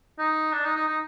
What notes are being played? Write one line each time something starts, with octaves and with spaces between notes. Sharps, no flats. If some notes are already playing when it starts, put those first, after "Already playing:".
D#4
D4
D#4
D#4
D#4